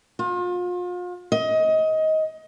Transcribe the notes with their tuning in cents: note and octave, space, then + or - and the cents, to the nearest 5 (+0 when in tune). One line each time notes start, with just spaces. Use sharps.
F4 +35
D#5 +20